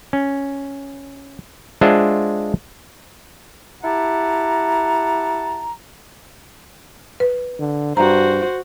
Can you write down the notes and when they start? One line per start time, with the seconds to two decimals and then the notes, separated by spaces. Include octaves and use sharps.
0.13 C#4
1.81 G#3 D4 F4 C5 E5 F#5
3.83 E4 G4 F#5 A5 A#5
7.20 B4
7.59 D3
7.97 G2 F#4 C5 A#5